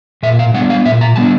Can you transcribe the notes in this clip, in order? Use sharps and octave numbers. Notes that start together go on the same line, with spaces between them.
A#2 E5
F5
G3 B3 D4 F#5
F5
A#2 E5
A#5
G3 B3 D4 A5